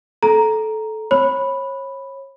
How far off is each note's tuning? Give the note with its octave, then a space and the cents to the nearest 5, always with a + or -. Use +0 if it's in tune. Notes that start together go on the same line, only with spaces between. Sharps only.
A4 -15 A#5 +0
C#5 -30 B5 +0